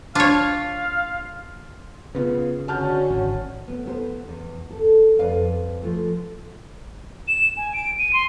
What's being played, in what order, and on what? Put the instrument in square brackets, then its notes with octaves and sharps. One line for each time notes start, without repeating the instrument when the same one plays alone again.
[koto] D4 C#5 [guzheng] F4 [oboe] F5
[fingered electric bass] C#3 [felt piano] B3 F4
[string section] D3 C#4 [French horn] F#4 [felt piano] A5 F6 G6
[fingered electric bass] G#1
[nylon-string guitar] B3
B3 A4 C5
E2
A4
F2 G3 B4 D5 F5
F3 G#3 A3
[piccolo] E7
G#5
D7
D#7
C6